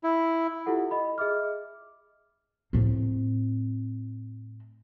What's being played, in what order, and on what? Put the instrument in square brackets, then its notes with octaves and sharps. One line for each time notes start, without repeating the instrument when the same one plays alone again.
[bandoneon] E4
[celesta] E4 F4 G4 A4 F#5
D#5 B5
G#4 D#5 E5 D6 F6
[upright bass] A2 C4